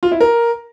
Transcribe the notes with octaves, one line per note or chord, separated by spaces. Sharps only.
F4
E4
A#4